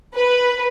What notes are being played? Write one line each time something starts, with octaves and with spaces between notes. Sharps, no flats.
B4